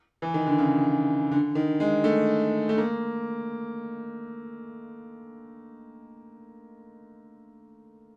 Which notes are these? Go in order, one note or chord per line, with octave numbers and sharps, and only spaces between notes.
E3
D#3
D3
C#3
D3
D#3
G#3
A3
A3
A#3